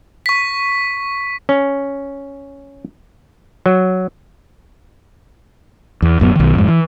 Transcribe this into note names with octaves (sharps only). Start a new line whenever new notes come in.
C#6 B6
C#4
F#3
E2
D1 F#2 B3
B1 D#3
F2 G#2
E3